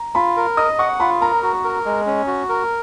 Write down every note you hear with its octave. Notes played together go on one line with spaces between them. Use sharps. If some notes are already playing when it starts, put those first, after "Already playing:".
Already playing: A#5
F4 B5
A#4
D#5 D#6
F#5 C#6
F4 B5
A#4 A#5
F#4
A#4
G#3
C#4
F#4
A#4